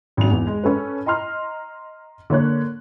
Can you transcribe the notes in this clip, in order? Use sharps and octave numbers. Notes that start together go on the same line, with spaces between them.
G#1 F#2 F7
E2
G#3
C#4 A4 B4
D#5 A#5 C6 F6
D3 A#3 C#5 F#6